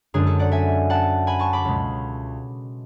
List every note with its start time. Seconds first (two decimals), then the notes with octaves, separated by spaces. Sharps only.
0.14 F#2 D3 G#3 D4 G#4
0.27 A4
0.39 D5 F#5
0.52 E5 G#5
0.90 F#5 A5
1.27 G#5 B5
1.39 A5 C#6
1.53 B5 D6
1.65 C#2 B2 G#3